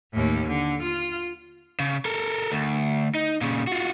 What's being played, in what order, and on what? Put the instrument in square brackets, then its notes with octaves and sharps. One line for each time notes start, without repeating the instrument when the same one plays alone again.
[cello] D#2 A2
D3
F4
[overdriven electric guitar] C#3
A4 A#4
D2
D#4
A#2 C#3
F4 F#4